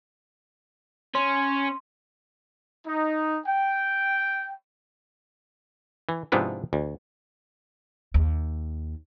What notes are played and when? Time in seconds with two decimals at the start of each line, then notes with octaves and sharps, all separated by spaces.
1.15 C#4 C6
2.86 D#4
3.46 G5
6.09 E3
6.32 G#2 C3 F3 B3 D4 E4
6.73 D2
8.14 D#2